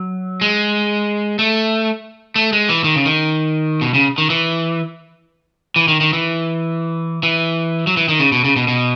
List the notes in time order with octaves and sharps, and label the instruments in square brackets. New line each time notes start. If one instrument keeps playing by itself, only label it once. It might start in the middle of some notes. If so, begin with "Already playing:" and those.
Already playing: [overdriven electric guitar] F#3
G#3
A3
A3
G#3
E3
D#3
C#3
D#3
B2
C#3
D#3
E3
E3
D#3
D#3
E3
E3
F#3
E3
D#3
C#3
B2
C#3
B2
B2